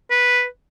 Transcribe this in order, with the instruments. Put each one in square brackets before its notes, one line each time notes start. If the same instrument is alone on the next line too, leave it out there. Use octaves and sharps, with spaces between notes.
[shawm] B4